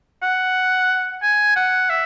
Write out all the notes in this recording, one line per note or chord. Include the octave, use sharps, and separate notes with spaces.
F#5
G#5
F#5
E5